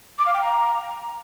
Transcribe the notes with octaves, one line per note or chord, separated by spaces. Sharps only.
D6
F5
G5
A#5